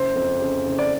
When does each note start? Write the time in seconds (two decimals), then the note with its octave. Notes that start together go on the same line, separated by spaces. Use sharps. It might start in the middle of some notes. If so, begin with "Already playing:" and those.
Already playing: F#1 C5
0.16 F2
0.40 C#3
0.65 F#1
0.79 D5